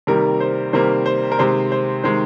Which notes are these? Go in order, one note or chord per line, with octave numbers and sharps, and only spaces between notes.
C3 D#3 G3 A#3 A#4
C5
C3 D#3 G3 A#3 C5
C5
A#4
C3 D#3 G#3 C5
C5
C3 D#3 G#3 C5